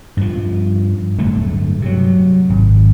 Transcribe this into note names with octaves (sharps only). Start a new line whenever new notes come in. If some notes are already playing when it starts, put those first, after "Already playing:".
G2 F3
D1 G2 D3 A3
C3 F#3
G#1